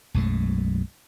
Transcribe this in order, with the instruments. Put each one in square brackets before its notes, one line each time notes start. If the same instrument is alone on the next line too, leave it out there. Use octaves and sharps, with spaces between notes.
[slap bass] B1 F#2 G#3 A3